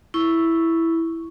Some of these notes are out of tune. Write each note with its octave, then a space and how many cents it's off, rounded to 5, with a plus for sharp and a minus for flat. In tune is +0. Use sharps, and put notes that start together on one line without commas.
E4 +0 C#6 +0